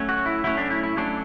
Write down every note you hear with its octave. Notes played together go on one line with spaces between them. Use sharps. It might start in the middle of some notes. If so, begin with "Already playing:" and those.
Already playing: F#3 A3 C#4
F#4
E4
F#3 A3 C#4 E4
D4
E4
E4
F#3 A3 C#4 D4